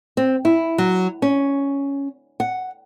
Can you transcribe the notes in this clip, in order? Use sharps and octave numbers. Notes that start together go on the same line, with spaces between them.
C4
E4
F#3
C#4
F#5